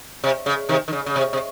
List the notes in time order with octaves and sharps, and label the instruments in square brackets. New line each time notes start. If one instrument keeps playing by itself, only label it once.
[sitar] C3
C#3
C3 D#3
D#3
C#3
C#3
C3
C3